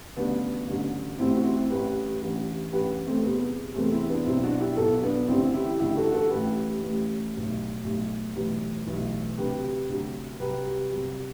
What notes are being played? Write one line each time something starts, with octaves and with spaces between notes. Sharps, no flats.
A1 G2 D3 F#3 B3 D4
A1 G2 D3 F#3
A1 A2 G3 C4 E4
F#4
C4 E4
A1 A2 G3 G4 B4
A1 G2 E3 G3
A1 G2 E3 G3 G4 B4
A3 C4
E2 C3 E3 G3 B3
E2 C3 E3 G3 A3 C4
C4 E4
B3 D4
B1 B2 F#3 C4 E4
D4 F#4
E4 G4
B1 B2 F#3 F#4 A4
B3 D4
A1 G2 D3 G3 C4 E4
E4 G4
A1 G2 D3 G3 E4 G4
F#4 A4
F#4 A4
A1 A2 E3 G3 G4 B4
A1 A2 E3 G3
B1 A2 G3
B1 A2 G3
B1 A2 E3 G3
B1 A2 E3 G3
D2 C3 F#3 G4 B4
D2 C3 F#3
C2 C3 F#3 G4 B4
C2 C3 F#3